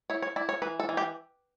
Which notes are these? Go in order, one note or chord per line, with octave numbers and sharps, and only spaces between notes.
E4 C#5
C#5
E4 D5
C#5
E3 B4
A4
E3
G4